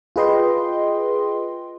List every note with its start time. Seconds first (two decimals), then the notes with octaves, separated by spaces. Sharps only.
0.16 F4 G#4 B4 D#5 G5 C6